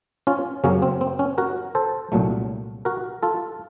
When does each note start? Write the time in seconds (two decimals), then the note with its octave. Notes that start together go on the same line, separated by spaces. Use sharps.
0.27 C#4 F4
0.64 F#2 C#3 F#3 A#3 C#4
0.82 C4
1.01 C4
1.19 C#4
1.38 F#4 A#4
1.75 A4 C5
2.12 C2 A#2 F#3 A3
2.85 F#4 A#4
3.23 F4 A4